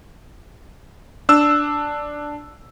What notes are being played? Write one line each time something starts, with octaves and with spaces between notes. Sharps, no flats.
D4 E6